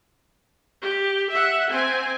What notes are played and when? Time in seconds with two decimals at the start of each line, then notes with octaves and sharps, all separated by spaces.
0.82 G4
1.31 E5 F#5
1.71 C4 G#5